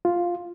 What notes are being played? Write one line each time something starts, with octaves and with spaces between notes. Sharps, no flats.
F4